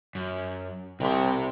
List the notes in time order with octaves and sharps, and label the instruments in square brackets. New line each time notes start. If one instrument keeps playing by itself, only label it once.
[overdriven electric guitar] F#2
[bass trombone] C2 [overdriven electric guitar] C3 C6